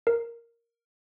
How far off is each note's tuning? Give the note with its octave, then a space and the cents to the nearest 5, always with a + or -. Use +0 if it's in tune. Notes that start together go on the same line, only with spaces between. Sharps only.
A#4 +0